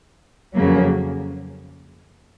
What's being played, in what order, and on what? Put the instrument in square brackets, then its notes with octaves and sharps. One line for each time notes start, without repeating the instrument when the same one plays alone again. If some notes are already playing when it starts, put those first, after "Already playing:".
[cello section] F2 C#3 F#3 A#3